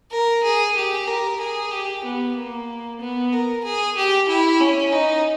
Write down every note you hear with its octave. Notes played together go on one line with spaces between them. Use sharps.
A#4
G#4
G4
A#4
G#4
G4
B3
A#3
B3
A#4
G#4
G4
E4
C#4
D#4